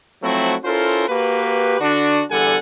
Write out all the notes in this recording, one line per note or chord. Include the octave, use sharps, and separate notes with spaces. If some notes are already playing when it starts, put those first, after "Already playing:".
F3 F#3 A3 C4 E4 F#4
C#4 E4 F4 A4 A#4 C5
A#3 F#4 G4 B4
D3 D4 F#4
E2 D3 G3 A4 F#5 G#5